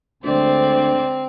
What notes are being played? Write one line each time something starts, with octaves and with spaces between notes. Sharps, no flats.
D2 D3 G#3 C4 C5 D5